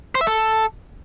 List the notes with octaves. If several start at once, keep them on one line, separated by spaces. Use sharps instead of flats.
C5
E5
A4